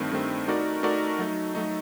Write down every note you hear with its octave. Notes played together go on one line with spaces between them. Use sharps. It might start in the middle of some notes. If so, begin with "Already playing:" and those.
Already playing: G2 D#3 A3 C4
G2 D#3 A3 C4
A3 D#4 F#4 A#4 D5
A3 D#4 F#4 A#4 D5
F#3 A3 D#4
F#3 A3 D#4